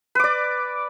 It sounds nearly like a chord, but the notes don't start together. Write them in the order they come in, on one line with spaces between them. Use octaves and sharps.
B4 D6 D5